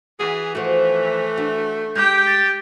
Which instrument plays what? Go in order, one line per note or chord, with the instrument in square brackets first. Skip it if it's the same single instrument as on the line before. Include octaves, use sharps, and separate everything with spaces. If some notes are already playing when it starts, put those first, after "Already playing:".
[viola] E3 [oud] F#4 [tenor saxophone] G#4
[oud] F3 F#4 [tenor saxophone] A3
[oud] D4 F#4
[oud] G#3 [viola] G4 G5 [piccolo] G6
[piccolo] A6